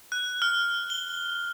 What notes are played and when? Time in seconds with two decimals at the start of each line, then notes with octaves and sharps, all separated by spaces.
0.12 F#6
0.42 F6
0.90 G7